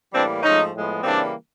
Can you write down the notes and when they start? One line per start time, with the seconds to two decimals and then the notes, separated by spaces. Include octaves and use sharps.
0.13 A2 E3 G3 A#3 C4 D4
0.43 G#2 F3 A3 C#4 D#4
0.73 A2 F3 G#3 B3
1.03 C#3 E3 G3 A#3 C4 D4